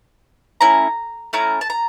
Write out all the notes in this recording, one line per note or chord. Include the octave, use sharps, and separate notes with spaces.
A3 C#4 E4 A#5
A3 C#4 E4 A#5
A5
A#5